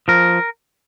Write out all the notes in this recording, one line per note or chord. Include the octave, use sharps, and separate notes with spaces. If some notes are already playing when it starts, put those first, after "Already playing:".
F3 A#4